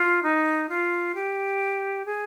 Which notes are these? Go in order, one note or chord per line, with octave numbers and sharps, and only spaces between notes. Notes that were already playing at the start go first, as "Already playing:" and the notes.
Already playing: F4
D#4
F4
G4
G#4